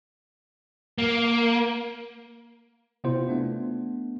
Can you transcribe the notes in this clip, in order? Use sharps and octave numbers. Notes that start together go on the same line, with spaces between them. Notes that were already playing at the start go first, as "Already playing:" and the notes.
A#3
C3 B3 C4 E4 F4 C5
A3 B3 D4